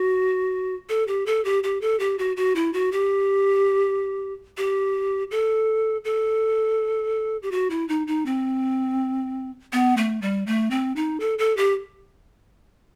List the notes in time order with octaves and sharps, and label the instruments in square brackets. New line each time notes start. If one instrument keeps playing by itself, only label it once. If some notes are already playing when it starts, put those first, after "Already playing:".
Already playing: [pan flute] F#4
A4
G4
A4
G4
G4
A4
G4
F#4
F#4
E4
F#4
G4
G4
A4
A4
G4
F#4
E4
D#4
D#4
C4
B3
A3
G3
A3
C4
D#4
A4
A4
G4